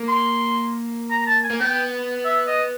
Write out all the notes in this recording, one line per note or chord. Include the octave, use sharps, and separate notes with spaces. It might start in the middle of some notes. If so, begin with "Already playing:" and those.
Already playing: A#3
C6
A#5
A5
G#5
A#3
B3 G5
E5
D#5